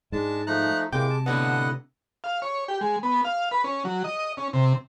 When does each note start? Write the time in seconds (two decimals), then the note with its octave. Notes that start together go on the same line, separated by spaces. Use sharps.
0.12 G#2 G#3 D4 A5
0.47 F3 A3 D#4 A#5 F#6
0.92 A2 C3 G#3 A#3 G5 D6
1.10 A5
1.26 A2 D3 B3 D#5 F#5
2.24 F5
2.42 C#5
2.68 G4
2.81 G#3
3.03 B3
3.25 F5
3.51 B4
3.64 C#4
3.85 F#3
4.04 D#5
4.37 C#4
4.53 C3